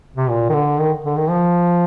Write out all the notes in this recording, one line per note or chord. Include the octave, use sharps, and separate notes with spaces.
C3
A#2
D#3
D3
D#3
D3
D#3
F3